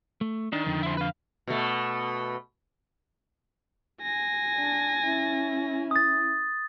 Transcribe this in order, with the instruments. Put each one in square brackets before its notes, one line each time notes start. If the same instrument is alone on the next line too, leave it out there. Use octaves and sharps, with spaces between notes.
[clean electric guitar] A3
[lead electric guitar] D#3 [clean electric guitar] D4
[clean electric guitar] F2 D3
[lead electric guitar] E4 C5
B4 F5
[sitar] B2 A3
[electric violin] G#5 A#6
[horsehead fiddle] D4
C#4 E4
[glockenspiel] D#6 A6